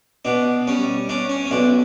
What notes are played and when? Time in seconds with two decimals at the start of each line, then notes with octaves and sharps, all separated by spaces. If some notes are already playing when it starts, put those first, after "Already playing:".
0.25 B2 D4
0.67 G3 C#4
1.09 C#4 D4
1.29 C#4
1.45 C#4
1.51 B1 D4